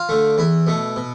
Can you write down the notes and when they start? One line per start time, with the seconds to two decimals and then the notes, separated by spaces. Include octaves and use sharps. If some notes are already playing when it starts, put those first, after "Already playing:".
Already playing: F4
0.09 D3 A3
0.38 E2 E4
0.67 B2 A3
0.96 B2